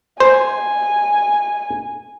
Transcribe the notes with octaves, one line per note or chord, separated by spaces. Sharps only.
C5 G#5